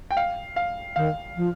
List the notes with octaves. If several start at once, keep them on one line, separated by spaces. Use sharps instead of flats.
G5
F5
F5
D#3 F5
F3